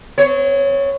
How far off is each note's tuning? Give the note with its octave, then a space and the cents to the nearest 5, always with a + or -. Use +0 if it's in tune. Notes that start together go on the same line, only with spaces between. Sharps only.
C4 -45 C#5 +0